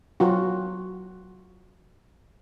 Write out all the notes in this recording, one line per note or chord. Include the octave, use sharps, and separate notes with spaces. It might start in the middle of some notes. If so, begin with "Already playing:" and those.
F#3 F4 F#4